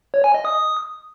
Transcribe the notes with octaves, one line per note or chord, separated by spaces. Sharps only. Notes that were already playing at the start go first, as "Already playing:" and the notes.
C#5
G#5
D#5
D#6